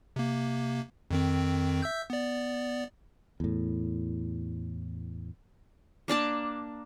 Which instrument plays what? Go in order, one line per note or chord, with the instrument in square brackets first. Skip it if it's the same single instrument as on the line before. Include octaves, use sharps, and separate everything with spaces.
[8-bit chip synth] C3 A#3
F2 D#3 C4
E5 E6 G6
B3 D5
[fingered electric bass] E2 A2
[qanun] A#3 D4 D5 A5